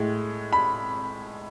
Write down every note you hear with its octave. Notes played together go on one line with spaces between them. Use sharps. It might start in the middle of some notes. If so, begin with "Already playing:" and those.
Already playing: A2 G#3
B5